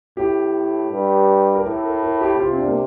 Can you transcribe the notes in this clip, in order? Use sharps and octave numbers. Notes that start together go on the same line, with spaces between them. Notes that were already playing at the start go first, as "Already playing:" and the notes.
A2 G4
G2
A#4
A2 A4
A#4
A#4
G4
C3 F4
C4
D4
A#3